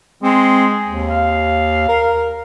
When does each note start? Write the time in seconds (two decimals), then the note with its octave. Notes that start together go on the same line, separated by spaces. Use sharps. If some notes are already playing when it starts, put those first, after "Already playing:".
0.23 G#3 C4
0.87 D#2
1.10 F5
1.88 A#4